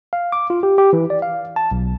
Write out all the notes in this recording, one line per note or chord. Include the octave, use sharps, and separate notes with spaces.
F5
D6
F4
G4
G4
E3
D5
F5
A5
B1